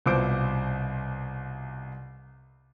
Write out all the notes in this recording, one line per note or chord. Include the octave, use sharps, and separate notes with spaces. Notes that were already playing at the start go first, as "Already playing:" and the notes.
C2 B2 F4 C5 D6 D7